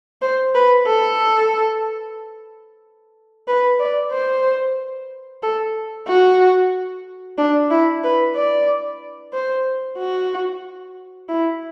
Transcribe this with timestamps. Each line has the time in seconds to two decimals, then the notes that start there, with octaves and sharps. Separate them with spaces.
0.22 C5
0.54 B4
0.86 A4
3.47 B4
3.79 D5
4.11 C5
5.42 A4
6.07 F#4
7.37 D4
7.70 E4
8.03 B4
8.35 D5
9.33 C5
9.98 F#4
11.28 E4